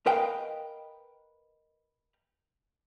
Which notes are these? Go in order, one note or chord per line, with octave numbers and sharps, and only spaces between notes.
A#4 B4 D#5 F5 G5